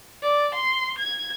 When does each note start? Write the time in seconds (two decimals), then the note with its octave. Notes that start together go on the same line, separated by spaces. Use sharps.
0.23 D5
0.55 C6
0.98 G#6